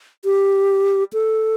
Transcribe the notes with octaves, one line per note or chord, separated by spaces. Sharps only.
G4
A4